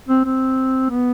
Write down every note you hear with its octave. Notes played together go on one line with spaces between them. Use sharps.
C4
C4
B3